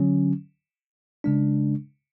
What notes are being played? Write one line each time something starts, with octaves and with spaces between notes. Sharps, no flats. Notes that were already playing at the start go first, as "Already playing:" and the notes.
Already playing: D3 F#3 C#4
C#3 G#3 D4